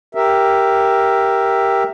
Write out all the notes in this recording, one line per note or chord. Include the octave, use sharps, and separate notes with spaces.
G4 A#4 E5